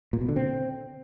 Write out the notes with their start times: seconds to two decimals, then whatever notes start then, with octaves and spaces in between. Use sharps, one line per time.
0.13 A#2
0.21 B2
0.29 D3
0.36 C4